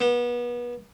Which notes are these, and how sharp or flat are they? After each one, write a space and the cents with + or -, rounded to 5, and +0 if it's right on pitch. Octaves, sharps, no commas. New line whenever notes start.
B3 -30